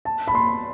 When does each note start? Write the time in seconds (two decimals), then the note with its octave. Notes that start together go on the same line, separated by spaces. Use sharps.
0.05 A5
0.28 B5
0.35 C6